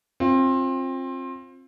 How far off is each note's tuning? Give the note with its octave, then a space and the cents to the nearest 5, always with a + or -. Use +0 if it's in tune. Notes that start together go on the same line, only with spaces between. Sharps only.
C4 +25 F4 +15